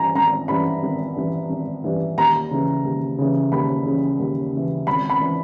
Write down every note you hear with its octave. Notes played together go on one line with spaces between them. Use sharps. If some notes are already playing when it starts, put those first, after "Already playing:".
Already playing: G2 E3 G#5 A#5
G#1 A#5
G2 E3 B5
G#1
G2 E3
G#1
G2 E3
D#2 A#5
C#3 E3
D#2
C#3 E3
D#2 B5
C#3 E3
D#2
C#3 E3
G#1 B5
B5
E3